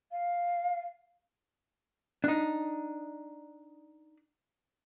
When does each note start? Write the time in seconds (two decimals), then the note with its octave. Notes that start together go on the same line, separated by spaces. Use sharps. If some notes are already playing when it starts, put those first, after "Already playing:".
0.11 F5
2.24 D4 D#4